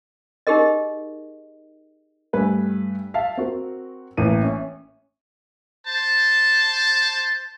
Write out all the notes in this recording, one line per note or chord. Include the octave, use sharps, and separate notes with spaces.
D#4 G4 G#4 A#4 D#5
G2 A3 B4 G#5
E5 F5 A5
C4 F#4 A#4
A1 E3 A#3 D#7
C#4 E5
C5 A5